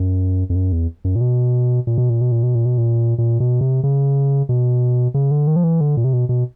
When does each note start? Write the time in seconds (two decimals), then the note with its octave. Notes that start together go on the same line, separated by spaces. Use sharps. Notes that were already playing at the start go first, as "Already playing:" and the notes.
Already playing: F#2
0.50 F2
0.55 F#2
0.72 E2
1.05 F#2
1.16 A#2
1.21 B2
1.87 A#2
1.98 B2
2.10 A#2
2.21 B2
2.32 A#2
2.43 B2
2.55 A#2
2.65 B2
2.78 A#2
3.18 A#2
3.40 B2
3.61 C3
3.83 C#3
4.49 B2
5.14 C#3
5.31 D3
5.47 D#3
5.56 F3
5.64 E3
5.81 D3
5.97 A#2
6.04 C3
6.13 B2
6.29 B2